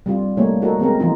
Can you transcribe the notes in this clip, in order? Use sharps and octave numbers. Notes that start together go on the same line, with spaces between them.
G3 C4 F4
G3 A3 A#3 D#4 C#5
D#4 F#4 A4 A#4
G#3 B3 C4 A#4
E3 F3 D#4 F4